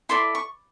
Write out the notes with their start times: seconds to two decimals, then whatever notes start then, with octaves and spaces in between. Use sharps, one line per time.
0.09 E4 A4 D5 C6
0.35 C#6